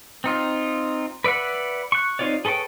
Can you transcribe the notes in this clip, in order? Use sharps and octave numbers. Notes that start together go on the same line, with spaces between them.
C4 D#4 F4
B4 D5 E5 F#5 B5
C#6 F#6
C4 D#4 F4 C#5 D5
G#4 A4 B4 C#5 G5